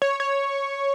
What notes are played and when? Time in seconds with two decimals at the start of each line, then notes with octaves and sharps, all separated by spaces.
0.02 C#5
0.20 C#5